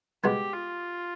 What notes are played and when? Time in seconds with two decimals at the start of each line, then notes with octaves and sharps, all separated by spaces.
0.24 B2 G#3 B3 G4
0.53 F4